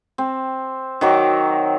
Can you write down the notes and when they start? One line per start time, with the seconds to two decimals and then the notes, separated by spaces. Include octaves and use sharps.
0.18 C4
1.01 D#3 F#3 D6